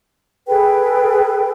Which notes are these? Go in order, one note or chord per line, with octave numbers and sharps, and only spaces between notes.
G#4 A4 B4 G5